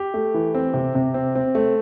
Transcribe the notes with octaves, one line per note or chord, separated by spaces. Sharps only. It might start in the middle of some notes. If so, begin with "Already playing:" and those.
Already playing: G4
A3
E3
C4
C3
C3
C4
C4
A3